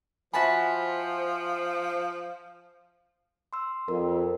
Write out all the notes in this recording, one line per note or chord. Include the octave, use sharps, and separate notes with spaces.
F3 F#4 C5 E5 G#5 A5 B5
C6 E6
F2 A#4